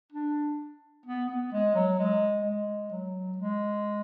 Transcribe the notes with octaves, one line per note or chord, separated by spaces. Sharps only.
D4
B3
B3
G#3
F#3
G#3
G#3
F#3
G#3